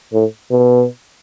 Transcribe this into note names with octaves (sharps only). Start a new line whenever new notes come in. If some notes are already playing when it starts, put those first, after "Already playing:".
A2
B2